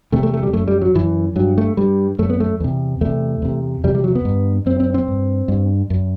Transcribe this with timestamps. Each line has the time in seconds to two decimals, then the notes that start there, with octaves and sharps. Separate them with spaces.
0.12 E2 C3 A3
0.23 A3
0.34 A3
0.43 G3
0.53 F#2 A3
0.68 G3
0.81 F#3
0.95 F#2 E3
1.36 G2 F#3
1.58 A3
1.77 G2 G3
2.19 F#2 A3
2.30 B3
2.40 A3
2.60 E2 C3
3.01 E2 C3 A3
3.42 E2 C3
3.84 E2 C3 G3
3.95 G3
4.04 F#3
4.15 B3
4.25 G2
4.66 F#2 C4
4.80 C4
4.94 C4
5.08 G2
5.48 G2
5.90 F#2